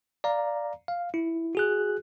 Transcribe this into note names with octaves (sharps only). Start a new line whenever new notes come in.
D5 F5 A#5
F5
E4
F#4 G#4 F#6